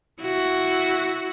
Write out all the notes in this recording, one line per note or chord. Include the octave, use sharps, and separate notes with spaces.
E4 F#4